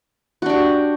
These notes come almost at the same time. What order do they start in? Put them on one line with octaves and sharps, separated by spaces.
F#4 D4 G4